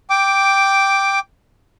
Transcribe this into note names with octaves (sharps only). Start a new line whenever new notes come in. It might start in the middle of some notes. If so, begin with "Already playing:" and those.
G5 D6